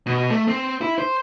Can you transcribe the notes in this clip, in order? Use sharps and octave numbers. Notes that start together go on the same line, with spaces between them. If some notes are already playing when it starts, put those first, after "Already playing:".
B2
A3
C4
E4
C5